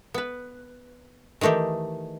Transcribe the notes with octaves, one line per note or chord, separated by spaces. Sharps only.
B3 B4
D#3 E3 A3 D#4 G4